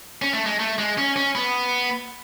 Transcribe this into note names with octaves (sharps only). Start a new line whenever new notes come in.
C#4
A3
G#3
A3
G#3
C#4
C#4
B3